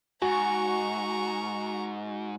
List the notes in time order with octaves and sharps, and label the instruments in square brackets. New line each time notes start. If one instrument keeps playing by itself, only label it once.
[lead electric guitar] G#2 [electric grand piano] F#4 [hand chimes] G#5 [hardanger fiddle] A#5 C#6